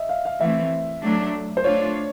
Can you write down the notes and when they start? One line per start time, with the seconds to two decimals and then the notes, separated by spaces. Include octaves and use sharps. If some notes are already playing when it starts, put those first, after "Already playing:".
Already playing: D#5 E5
0.09 F5
0.25 F5
0.40 E3 A3 C4 E5
1.02 F#3 A3 D4
1.57 C5
1.64 A3 D4 F4 C#5